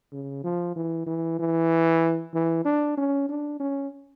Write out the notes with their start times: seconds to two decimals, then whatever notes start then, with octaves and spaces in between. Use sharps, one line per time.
0.12 C#3
0.44 F3
0.76 E3
1.07 E3
1.39 E3
2.34 E3
2.65 D4
2.97 C#4
3.29 D4
3.60 C#4